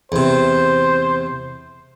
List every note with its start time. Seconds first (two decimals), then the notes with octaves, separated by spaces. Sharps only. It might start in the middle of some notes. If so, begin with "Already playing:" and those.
0.12 E2 C3 C5